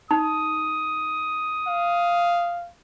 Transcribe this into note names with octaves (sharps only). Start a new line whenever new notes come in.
D#4 D#6
F5